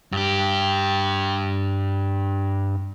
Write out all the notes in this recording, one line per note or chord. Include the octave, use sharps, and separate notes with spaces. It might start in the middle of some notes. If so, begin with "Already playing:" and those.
G2 G4